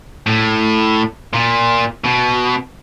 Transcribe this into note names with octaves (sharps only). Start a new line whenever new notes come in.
A2
A#2
B2